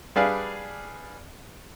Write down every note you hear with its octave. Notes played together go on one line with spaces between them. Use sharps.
G3 D4 G#4 B4 F5